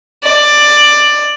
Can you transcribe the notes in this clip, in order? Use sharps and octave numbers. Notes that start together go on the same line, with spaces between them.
D5